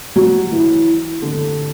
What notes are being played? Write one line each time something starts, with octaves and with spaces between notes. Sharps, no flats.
F#3
E3
D3